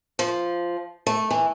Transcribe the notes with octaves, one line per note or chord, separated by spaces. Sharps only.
F3
A3
E3